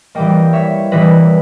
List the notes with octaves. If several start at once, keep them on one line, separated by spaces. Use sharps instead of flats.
E3 G3 A#3 D#5 G5
C#5 E5
E3 G3 A#3 B4 D#5